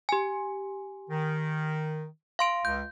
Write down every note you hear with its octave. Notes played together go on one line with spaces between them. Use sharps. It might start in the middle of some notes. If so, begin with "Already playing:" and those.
G4 G#5
D#3
F5 C6 D7
C#2 G6